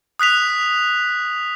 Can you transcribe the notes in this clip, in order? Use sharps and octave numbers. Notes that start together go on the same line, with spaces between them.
D#6 F#6 B6 F7